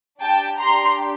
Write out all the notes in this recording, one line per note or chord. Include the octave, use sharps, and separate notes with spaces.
D4 G4 G5 A5
A#5 C6